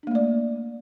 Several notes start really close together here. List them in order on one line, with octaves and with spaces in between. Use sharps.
D4 A#3 A3 D5